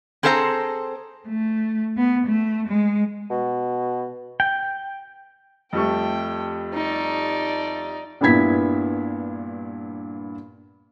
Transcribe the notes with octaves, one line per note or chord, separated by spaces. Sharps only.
C4 G#4 A4 C5 E5 A#5
A3
B3
A3
G#3
B2
G5
F2 G3 A3 G5
D#4 D5
G2 A#2 B3 E4 G#6 B6